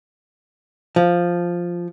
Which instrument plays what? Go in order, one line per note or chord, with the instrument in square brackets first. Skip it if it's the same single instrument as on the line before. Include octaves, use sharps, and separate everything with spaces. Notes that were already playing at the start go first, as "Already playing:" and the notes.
[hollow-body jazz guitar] F3